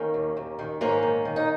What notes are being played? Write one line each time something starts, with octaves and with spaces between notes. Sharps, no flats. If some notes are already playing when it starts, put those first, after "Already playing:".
Already playing: D#3 A#3 C#4
D#2
D#2
D#3
G#2 A#3 C#4
D#3
D#3
D#4